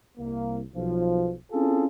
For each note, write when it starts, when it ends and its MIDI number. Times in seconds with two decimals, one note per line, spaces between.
0.18 0.61 36
0.18 0.61 58
0.74 1.33 35
0.74 1.33 53
1.52 1.86 60
1.52 1.86 61
1.52 1.86 64
1.52 1.86 65
1.52 1.86 68
1.52 1.86 69